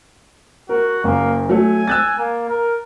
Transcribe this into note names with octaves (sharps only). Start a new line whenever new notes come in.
F#4 A#4
F#1 A#3
F#3 A3 G#5
E6 F#6 A6
A#3
A#4